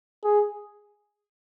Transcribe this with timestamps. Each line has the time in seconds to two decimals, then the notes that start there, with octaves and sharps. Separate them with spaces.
0.24 G#4